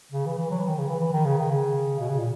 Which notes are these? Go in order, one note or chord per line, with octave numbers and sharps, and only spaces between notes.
C#3
E3
E3
F#3
E3
D#3
C#3
E3
E3
D#3
C#3
D#3
C#3
B2
C#3
A#2